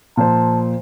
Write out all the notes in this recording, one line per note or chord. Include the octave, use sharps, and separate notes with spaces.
A#2 F3 C5 A5